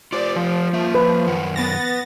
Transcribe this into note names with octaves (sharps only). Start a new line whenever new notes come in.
F4 G4 C5 D5
F3
A#3 E5
B4
F#2 D#3 F#5
B3 A6 A#6